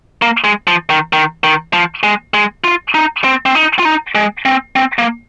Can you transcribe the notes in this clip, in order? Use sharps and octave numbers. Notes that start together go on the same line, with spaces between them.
A#3
G#3
F3
D#3
D#3
D#3
F3
G#3
G#3
F4
D#4
C4
C4
D#4
F4
D#4
G#3
C4
C4
A#3